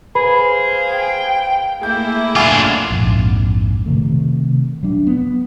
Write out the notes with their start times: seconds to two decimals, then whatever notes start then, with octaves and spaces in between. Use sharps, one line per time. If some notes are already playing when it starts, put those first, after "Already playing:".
0.15 G#4 B4 C5 F5 B5
0.92 G5
1.81 A3 A#3 E4 G#4 G6
2.36 D4 F4 F#5 G#5 D6
2.90 A#1 F2 G#2
3.86 C3 D#3 A3
4.83 F#3 D4
5.07 B3